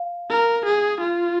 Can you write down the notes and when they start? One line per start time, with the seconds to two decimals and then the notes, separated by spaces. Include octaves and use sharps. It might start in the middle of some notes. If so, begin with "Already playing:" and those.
Already playing: F5
0.30 A#4
0.65 G#4
1.00 F4